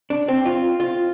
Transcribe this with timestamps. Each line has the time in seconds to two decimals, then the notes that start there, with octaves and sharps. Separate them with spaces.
0.10 D4
0.28 C4
0.45 F4
0.80 F4